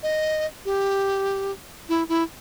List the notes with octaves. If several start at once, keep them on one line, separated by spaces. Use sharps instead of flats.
D#5
G4
E4
E4